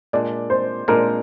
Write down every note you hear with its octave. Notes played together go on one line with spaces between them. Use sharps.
A#2 G#3 D4 D5
C5
A#2 G#3 D4 A#4